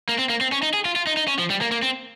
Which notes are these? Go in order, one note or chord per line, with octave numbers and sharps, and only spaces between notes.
A#3
C4
A#3
C4
C#4
D#4
G#4
F4
F4
D#4
D#4
C#4
F3
G3
A#3
A#3
C4